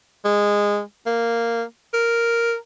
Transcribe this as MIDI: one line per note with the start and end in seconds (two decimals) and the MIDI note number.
0.25 0.81 56
1.07 1.63 58
1.94 2.55 70